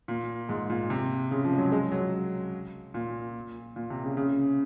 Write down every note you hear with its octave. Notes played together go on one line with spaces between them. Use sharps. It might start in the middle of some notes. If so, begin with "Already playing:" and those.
A#2
G#2
A#2
C3
C#3
F3
G#3
F#3
G#3
F#3
A#2
A#2
C3
C#3
C#3